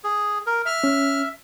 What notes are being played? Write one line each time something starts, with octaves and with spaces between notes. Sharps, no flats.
G#4
A#4
E5 F6
C#4